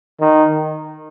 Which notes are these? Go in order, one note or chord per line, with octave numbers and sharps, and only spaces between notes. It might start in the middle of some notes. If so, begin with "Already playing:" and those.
D#3